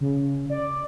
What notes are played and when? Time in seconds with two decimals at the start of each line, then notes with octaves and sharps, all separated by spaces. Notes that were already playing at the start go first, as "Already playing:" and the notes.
0.01 C#3
0.50 D5